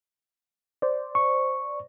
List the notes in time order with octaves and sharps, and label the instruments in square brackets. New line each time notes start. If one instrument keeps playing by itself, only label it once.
[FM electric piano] C5 D5
[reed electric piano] C#6